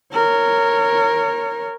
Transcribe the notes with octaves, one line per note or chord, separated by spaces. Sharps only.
A#4 C#5